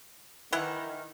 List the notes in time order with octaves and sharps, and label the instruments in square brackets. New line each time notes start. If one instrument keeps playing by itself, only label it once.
[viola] D#3 [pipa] E3 E4 F#5